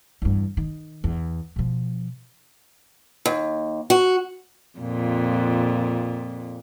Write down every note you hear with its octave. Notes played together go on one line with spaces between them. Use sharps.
E2 G2
D#3
E2
B2 F3
D#2
F#4
F2 A#2